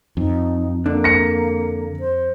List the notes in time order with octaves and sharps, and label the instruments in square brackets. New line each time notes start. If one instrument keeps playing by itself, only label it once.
[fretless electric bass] F2 [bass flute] D#4
[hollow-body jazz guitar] D3 D4 [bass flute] A#3
[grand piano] A#6 C#7
[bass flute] C5